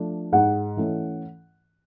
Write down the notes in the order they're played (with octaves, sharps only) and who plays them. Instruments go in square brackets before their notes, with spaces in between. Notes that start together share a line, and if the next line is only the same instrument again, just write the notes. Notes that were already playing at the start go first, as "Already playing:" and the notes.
Already playing: [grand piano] F3 A3 D4
[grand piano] G#2 [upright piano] F#5
[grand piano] E3 A3 C#4